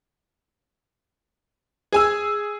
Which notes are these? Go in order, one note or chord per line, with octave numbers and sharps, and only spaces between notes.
G#4 G#5 E6